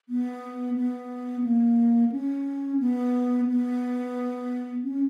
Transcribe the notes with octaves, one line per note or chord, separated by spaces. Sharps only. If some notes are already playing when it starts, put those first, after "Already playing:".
B3
B3
A#3
C#4
B3
B3
C#4